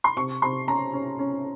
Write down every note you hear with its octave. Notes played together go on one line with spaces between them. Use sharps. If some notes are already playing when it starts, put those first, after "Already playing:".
C6
C3 C#6
C3 C6
C#4 A#5
C#4
C#4